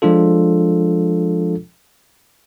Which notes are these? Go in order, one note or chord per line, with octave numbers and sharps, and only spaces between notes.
F3 G#3 D4 F4 A4